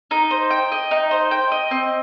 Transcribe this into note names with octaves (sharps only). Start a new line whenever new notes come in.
D#4
C5
G5
D#5
D#4
C5
G5
D#5
C4